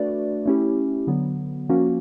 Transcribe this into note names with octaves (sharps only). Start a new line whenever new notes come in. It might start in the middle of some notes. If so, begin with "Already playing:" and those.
Already playing: A3 D4 F#4 B4 D5
A3 C#4 E4 G4
D3 F#3 B3
F3 A#3 C#4 F#4